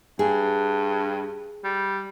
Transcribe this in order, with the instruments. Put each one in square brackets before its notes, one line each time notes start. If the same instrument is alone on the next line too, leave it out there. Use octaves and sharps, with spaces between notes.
[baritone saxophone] G2 [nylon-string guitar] G#4
[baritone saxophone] G3